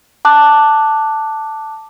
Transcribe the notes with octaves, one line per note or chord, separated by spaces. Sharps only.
A5 D6 F#6